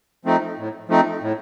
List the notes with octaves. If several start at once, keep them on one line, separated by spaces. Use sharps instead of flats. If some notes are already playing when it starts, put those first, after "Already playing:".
F3 A3 C4 D#4
A2
F3 A3 C4 D#4
A2